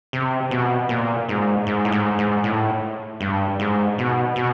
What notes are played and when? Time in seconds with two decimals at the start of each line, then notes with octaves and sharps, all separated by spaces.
0.13 C3
0.51 B2
0.89 A#2
1.29 G#2
1.67 G#2
1.85 A2
1.92 G#2
2.18 G#2
2.44 A2
3.21 G2
3.60 G#2
3.98 B2
4.36 B2